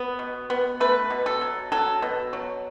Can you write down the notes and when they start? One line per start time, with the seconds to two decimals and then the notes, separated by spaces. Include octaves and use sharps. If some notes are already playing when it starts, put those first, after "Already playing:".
Already playing: B3
0.19 B2
0.50 B3
0.80 A3 B4
1.10 B2
1.26 A4
1.41 F#3
1.72 F#3 A4
2.02 B2
2.33 F#3